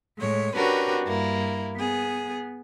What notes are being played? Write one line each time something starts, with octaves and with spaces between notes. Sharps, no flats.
A2 G#3 C#5
C#4 D4 F#4 G4 A#4 B4
G2 A#3 E4
B3 G#4